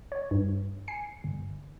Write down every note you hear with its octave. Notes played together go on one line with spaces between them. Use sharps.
C#5
G2
G#5 C7 C#7
G1